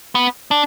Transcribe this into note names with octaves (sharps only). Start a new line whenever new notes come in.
B3
D4